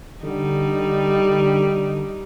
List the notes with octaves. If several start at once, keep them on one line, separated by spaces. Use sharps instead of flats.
D3 G3 D#4